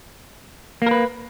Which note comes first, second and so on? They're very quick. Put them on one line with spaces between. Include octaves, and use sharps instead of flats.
A#3 A#4 B4